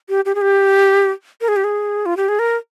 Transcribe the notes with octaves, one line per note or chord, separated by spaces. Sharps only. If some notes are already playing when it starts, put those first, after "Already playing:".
G4
G4
G#4
G4
A#4
G#4
G4
G#4
F4
G4
G#4
A#4